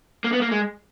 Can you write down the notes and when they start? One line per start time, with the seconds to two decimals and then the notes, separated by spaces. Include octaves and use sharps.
0.24 A#3
0.33 B3
0.41 A#3
0.51 G#3